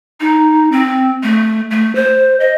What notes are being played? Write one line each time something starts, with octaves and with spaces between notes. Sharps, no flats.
D#4
C4
A3
A3
C5
D#5